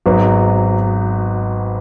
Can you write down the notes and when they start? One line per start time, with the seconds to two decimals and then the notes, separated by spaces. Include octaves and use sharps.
0.06 G#1 G#2 F#3 B3 D#4